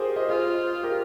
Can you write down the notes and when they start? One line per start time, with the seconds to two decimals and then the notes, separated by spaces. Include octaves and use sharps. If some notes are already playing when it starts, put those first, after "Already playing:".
Already playing: F4 G4 G#4 A#4 C5
0.16 C5 D#5
0.29 F4 G#4 C5
0.83 G4 A#4